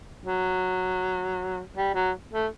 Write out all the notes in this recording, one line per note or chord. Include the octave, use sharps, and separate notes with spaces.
F#3
G3
F#3
A3